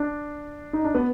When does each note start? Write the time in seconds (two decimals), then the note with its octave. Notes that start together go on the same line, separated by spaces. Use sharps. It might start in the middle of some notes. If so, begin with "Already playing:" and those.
Already playing: D4
0.73 D#4
0.85 D4
0.95 B3